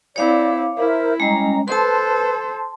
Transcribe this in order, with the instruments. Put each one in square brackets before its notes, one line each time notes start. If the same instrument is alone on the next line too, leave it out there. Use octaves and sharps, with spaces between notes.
[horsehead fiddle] C4 E4 [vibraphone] C#5 F5 D6 [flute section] D5
[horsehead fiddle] E4 [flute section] A#4 C5 E5
[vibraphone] G3 G#3 [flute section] C#4 D#5 A#5
[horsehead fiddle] A4 C5 [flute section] B4 [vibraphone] A5 C6